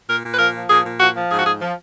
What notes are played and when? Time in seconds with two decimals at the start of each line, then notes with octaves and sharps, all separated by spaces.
0.08 A#2 A#4
0.24 A#2
0.34 B4
0.38 F3 A#4
0.54 F3
0.69 A#2 G#4
0.84 A#2
1.00 F3 F#4
1.15 F3
1.30 G#2 G#4
1.38 F#4
1.46 G#2 G#4
1.61 F3